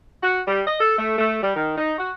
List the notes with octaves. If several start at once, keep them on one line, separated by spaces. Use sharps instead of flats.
F#4
G3
D#5
A4
A3
A3
G3
D#3
D#4
F#4